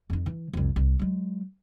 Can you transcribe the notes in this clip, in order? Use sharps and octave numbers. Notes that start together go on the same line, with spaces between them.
F2 D#4
E3
C2 F2
C2
F#3 G#3